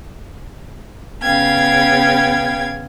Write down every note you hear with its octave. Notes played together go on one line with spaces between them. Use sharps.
C#3 B3 F5 G5 G#6